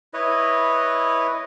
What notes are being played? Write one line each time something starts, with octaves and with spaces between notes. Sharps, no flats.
E4 B4 C#5 D#5